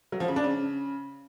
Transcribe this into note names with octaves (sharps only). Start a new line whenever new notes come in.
F#3
F3
C#3
D4
C#3